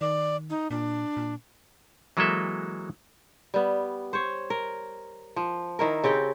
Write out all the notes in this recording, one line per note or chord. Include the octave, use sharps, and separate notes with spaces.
D#3 D5
D#4
A#2 D4
A#2
E3 F#3 G#3 A#3 A4 E5
G3 B3
C5 C#5
A#4
F3
D#3 E4 A#4
C#3 C4 G4 G5